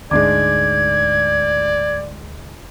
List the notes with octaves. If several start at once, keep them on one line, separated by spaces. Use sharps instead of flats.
D2 G#2 G#3 D4 D5 D6 G#6